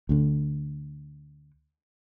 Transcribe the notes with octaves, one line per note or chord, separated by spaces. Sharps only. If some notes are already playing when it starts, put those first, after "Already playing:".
D2 D3